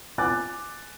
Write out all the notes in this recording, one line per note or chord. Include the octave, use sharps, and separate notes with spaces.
G#5 D6 F#6 A6